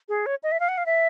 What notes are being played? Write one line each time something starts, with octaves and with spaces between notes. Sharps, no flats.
G#4
C#5
D#5
E5
F5
F#5
F5
E5